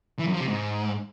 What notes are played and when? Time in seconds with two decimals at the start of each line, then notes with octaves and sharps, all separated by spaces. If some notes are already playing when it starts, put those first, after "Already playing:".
0.19 E3
0.26 F#2
0.34 F3
0.41 C3
0.48 G#2